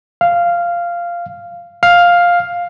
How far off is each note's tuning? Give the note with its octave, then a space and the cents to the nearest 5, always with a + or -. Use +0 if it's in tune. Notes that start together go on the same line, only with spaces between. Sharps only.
F5 -10
F5 +5